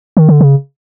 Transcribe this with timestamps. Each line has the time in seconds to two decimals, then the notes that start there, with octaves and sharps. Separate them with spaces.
0.17 D#3
0.29 D3
0.41 C#3